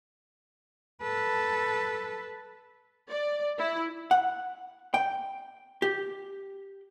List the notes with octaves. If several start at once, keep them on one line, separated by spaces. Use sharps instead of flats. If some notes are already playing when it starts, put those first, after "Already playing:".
A4 B4
D5
E4
F#5
G5
G4